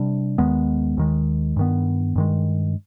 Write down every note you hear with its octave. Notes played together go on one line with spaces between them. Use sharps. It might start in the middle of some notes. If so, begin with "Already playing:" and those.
Already playing: C3 G3 D4
D#2 D#3 G#3 B3
D#2 D#3 G#3
G2 D#3 B3
G2 D#3 G#3